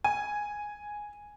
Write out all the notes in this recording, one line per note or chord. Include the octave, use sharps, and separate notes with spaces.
G#5